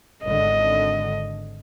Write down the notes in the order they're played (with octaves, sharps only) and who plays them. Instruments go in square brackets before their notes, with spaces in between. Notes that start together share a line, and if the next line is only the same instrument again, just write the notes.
[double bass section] G#1 D3 [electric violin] D#5